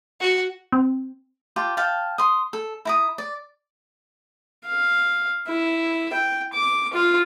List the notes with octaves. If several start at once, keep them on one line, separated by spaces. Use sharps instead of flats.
F#4
C4
F4 G4 A5
F5 G5 A5
C6 D#6
A4
E4 A#5 D#6
D5
F5
E4
G5
D6
F4